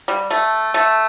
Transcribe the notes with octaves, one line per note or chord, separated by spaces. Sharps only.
G3
A3
A3